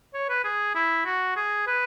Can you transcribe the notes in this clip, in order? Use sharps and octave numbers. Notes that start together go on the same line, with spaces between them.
C#5
B4
G#4
E4
F#4
G#4
B4